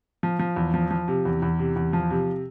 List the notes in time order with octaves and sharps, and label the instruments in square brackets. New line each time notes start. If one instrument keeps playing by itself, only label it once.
[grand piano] F3
F3
E2
F3
F3
C3
E2
E2
C3
E2
F3
C3